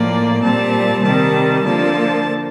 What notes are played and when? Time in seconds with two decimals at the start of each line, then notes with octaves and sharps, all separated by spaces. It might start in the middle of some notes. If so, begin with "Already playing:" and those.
Already playing: A2 F3 A#3 D5
0.42 A#2 G3 C4 A5
1.03 C3 D#3 G3 A5
1.63 D3 F3 A#3 A5